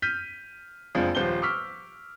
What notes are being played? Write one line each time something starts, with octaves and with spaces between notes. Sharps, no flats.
F6 G6 B6 D#7
F#1 F2 F3 G#3 D4
D#1 F3 C5 G6 G7
C#6 D6 E6 F6 B6